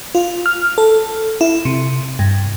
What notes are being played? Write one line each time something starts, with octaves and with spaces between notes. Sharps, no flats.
F4
F6
A4
E4
C3
G2